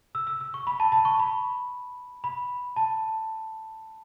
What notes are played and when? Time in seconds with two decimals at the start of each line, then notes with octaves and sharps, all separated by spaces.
0.15 E6
0.27 E6
0.41 E6
0.54 C#6
0.67 B5
0.80 A5
0.92 A5
1.05 C#6
1.19 B5
2.24 B5
2.76 A5